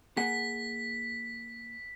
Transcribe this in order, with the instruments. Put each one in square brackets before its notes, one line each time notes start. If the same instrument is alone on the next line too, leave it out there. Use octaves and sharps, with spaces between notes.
[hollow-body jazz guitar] A#3 G#4 F#5 [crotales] B6